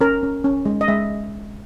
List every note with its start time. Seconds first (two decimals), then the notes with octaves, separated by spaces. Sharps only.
0.01 C#4 A#4
0.23 C#4
0.44 C#4
0.66 G#3
0.81 D#5
0.88 G#3 E5